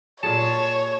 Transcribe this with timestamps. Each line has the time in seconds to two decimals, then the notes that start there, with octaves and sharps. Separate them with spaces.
0.23 A#2 G#4 C#5 A5